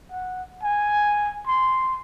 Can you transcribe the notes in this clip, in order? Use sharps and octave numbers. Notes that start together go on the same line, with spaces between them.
F#5
G#5
C6